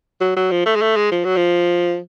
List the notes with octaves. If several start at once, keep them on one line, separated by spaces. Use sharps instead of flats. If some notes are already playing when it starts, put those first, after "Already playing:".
F#3
F#3
F3
A3
G#3
A3
G#3
F3
F#3
F3